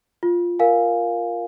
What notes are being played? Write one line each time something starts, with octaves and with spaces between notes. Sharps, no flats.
F4
A#4 F5 G#5